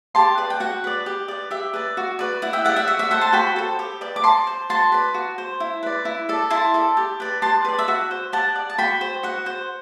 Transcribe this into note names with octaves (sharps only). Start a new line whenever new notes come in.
G4 A5 C6
B4 D5
G5
F#4 F#5
B4 D5
G4
B4 D5
G4 E5
B4 D5
F#4
B4 D5
E4 F#5
E5 G5
G4 D5 F#5
E5
F#4 F#5
E5
A4 C5 F#5
A5 C6
F#4 G5 B5
A4 C5
G4
B4 D5
D6
F#4 A5 C6
C5
F#4 A5 C6
B4 D5
F#4
C5
E4
B4 D5
E4
A4 D5
E4 A5 C6
A4 D5
G4
B4 D5
G4 A5 C6
B4 D5
E5
F#4 F#5
C5
G4 F#5 A5
D5
A5
F#4 G5 B5
C5
F#4 F#5
C5